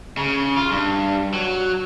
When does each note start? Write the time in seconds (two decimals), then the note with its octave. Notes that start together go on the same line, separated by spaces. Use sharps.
0.17 C#3
0.57 F4
0.71 G2
1.34 F#3